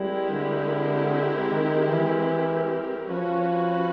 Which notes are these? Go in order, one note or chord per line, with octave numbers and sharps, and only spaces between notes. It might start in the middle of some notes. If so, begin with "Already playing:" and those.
Already playing: G3 G#3 C4 E4 G4 A#4
D3
D#3
E3
F3 C#4 F#4 B4